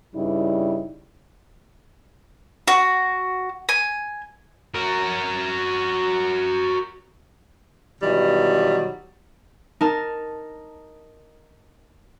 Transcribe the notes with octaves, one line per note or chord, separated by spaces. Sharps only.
G2 C#3 G3 D#4 E4
F#4
G#5
F#4 A#4
B2 D#3 E3 F#3 G3
D#4 A#4 A5